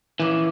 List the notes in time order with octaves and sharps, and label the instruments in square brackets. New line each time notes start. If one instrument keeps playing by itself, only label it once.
[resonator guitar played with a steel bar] A#2 F3 A#3 C#4 [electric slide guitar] E3